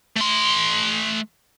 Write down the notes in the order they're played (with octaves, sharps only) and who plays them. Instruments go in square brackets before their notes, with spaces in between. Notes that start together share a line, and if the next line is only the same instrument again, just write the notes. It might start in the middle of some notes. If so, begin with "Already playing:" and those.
[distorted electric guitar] A3 C6